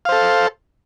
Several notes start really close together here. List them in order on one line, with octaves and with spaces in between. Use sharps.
F5 C5 A4